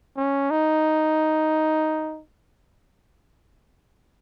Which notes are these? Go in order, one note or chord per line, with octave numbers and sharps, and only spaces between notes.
C#4
D#4